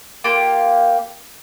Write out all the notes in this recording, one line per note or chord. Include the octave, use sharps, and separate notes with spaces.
A#3 F4 G4